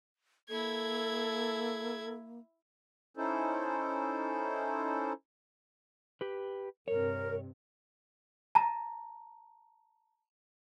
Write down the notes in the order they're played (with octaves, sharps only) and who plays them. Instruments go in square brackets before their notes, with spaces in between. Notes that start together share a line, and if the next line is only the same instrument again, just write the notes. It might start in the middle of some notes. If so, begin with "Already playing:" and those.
[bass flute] A#3 [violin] E4 G#6 [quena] A4
[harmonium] C#4 D#4 E4 A4 C5
[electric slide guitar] G4 B4
[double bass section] G2 C3 [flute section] A#4 [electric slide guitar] C#5
[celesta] A5 A#5